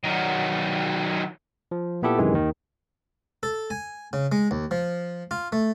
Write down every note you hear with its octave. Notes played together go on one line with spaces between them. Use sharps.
D#3 F#3
F3
A#2 B3 E4 G4 A4
F#2 C3 D#3 E3 G#3
D#2 D#3
A4
G#5
C#3
G#3
D#2
F3
F4
A3